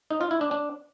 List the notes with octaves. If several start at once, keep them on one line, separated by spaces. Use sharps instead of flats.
D#4
F4
E4
D4
D4